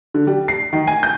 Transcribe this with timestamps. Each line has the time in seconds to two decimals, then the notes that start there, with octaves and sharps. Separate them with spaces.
0.14 D3
0.27 G3
0.48 C7
0.73 D#3
0.87 G#5
1.03 G6